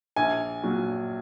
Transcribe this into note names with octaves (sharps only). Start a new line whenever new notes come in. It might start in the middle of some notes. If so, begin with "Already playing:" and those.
A#1 G#5
A#2 F#3